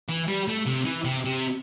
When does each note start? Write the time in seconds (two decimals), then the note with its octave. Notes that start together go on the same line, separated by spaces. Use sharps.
0.09 E3
0.28 G3
0.48 A3
0.66 C3
0.85 E3
1.05 C3
1.25 C3